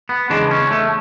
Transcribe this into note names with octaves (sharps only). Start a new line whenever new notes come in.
B3
E2 C#3 G#3 D4
C#4
A3